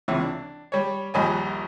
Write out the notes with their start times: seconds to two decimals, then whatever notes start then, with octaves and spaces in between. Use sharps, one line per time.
0.08 C#2 C3 E3
0.22 D4
0.72 G3 C#5
1.14 A#1 D#2 G3 D#5 G#5